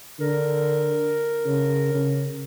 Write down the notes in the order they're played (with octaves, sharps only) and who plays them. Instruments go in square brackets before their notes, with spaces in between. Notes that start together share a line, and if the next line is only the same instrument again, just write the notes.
[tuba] D3 [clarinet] A#4
[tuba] C#3
C#3